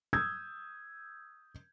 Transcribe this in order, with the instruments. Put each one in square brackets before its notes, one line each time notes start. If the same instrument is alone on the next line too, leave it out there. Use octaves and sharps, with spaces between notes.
[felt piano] D#6 E6 G6 G#6